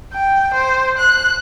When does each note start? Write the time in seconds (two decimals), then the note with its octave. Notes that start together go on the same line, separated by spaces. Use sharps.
0.13 G5
0.54 C5
0.98 F#6